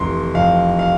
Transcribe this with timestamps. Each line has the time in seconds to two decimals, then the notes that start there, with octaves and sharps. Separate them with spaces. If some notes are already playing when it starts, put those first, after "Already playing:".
Already playing: F1 E3 C6
0.35 F2 F5
0.79 F5